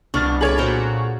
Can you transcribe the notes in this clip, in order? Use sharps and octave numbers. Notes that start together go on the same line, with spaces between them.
C2 B2 D4 C#6 F6 A6
G#4 A4 C#5 D5 G#5 B5
A#2 F#4 A#4 C5